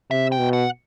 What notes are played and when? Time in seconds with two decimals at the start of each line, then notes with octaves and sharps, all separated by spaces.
0.11 C3 E5
0.32 G5
0.39 B2
0.53 F#5